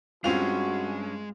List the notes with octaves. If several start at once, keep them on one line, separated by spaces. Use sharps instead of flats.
G2 G#3 C4 C#4 F4 F#4 F7